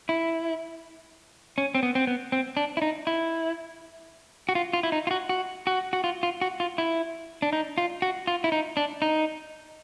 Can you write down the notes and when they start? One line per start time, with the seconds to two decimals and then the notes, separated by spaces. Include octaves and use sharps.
0.09 E4
1.58 C#4
1.75 C4
1.83 B3
1.95 C4
2.07 B3
2.32 C4
2.57 D4
2.77 E4
2.82 D#4
3.07 E4
4.49 F#4
4.55 F4
4.73 F4
4.83 E4
4.92 D#4
5.07 F4
5.11 F#4
5.29 F#4
5.67 F#4
5.93 F#4
6.04 F4
6.23 F4
6.41 F#4
6.60 F4
6.78 E4
7.42 D4
7.53 D#4
7.78 F4
8.02 F#4
8.27 F4
8.44 E4
8.52 D#4
8.77 D4
9.02 D#4